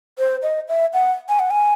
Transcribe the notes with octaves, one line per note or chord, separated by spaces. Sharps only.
C5
D#5
E5
F#5
G#5
F#5
G#5